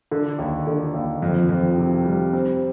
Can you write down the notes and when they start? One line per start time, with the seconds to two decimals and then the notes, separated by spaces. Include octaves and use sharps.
0.11 D3
0.39 D#2
0.67 D3
0.94 D#2
1.22 F2
1.49 F2
1.78 C3
2.05 G3
2.33 C4